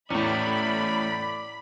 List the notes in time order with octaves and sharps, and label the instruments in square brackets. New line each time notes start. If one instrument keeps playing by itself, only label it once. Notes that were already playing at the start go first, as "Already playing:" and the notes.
[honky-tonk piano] E2 A2 [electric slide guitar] A3 C#4 [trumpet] D5 [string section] B5